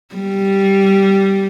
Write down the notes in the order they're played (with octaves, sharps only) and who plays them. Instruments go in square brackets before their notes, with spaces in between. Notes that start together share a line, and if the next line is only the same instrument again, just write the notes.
[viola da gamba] G3